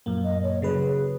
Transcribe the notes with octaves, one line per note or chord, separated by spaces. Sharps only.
F#2 A#2 A#3
D#5
C#5
C#3 F#3 G#4 B4